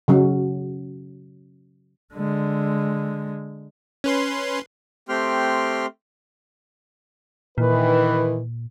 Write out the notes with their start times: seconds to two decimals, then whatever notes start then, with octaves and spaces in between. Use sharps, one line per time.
0.08 C#3 F#3 C#4
2.14 D3 G#3
4.04 C#4 B4 C6
5.09 A3 C4 G4 G5 C6 F6
7.58 A#2 D#3 E3 B4